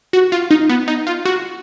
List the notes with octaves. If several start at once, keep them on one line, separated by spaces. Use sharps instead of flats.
F#4
F4
D#4
B3
D#4
F4
F#4